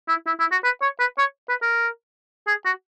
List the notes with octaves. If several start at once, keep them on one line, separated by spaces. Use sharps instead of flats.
E4
E4
E4
F#4
B4
C#5
B4
C#5
B4
A#4
G#4
F#4